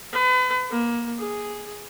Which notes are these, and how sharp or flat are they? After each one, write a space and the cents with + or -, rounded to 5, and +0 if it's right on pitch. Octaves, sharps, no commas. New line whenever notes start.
B4 +35
A#3 +20
G#4 +0